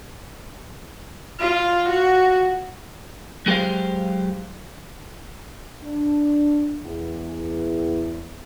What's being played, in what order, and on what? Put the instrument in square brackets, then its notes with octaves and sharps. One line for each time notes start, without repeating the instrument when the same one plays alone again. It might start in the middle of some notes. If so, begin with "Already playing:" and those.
[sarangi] F4
F#4
[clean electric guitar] F#3 G#3 G4 A4 C5 F5
[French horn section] D4
E2